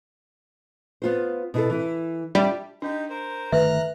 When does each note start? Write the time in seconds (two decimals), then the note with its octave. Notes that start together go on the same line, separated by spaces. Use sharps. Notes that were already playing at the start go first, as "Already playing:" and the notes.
1.02 B3 F4 C5
1.54 B2 E4 A4
1.70 E3 E4
2.35 G3 D4 F4 E5
2.82 D4 D#4 G4
3.10 A#4 C5
3.52 G1 D#3 A3 B4 E5 A#5 F6 F#6